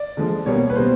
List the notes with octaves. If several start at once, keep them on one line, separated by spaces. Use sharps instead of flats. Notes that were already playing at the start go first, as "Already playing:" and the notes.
Already playing: D5
D3 F3 G#3
B2 G3 A#3 C#5
B4
B2 G3 A#3 C5